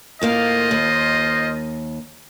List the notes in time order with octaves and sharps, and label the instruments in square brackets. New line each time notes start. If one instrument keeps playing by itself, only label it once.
[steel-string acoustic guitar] A2 A#3 F5 [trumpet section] F4 C5 D#5
[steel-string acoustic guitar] D#2